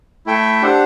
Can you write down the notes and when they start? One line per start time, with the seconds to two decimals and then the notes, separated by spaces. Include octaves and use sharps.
0.26 A3 E4 A4 E5 G5
0.62 D4 G4 C5 F#5